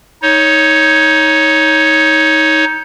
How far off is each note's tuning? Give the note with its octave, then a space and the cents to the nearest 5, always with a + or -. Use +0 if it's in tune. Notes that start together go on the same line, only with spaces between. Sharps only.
D#4 +20 C#5 +0